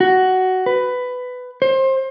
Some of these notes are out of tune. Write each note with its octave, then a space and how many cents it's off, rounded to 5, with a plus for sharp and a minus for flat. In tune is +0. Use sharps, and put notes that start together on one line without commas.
F#4 +10
B4 +15
C5 +25